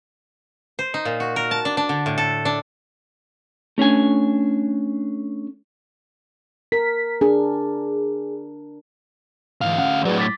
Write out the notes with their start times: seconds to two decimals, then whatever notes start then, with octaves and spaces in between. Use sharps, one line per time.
0.79 C5
0.94 D#4
1.05 A#2
1.20 F#4
1.36 A#4
1.51 A5
1.65 D4
1.77 D4
1.89 D3
2.06 A2
2.18 A4
2.45 D4
3.78 A3 C#4 D4 G#5
6.72 A#4 B6
7.21 D4 G#4
9.61 D2 G#2 E3 F5
9.78 C#4 F#5
10.05 A2 F#3 G#4 B4 D5
10.18 D6 A6 B6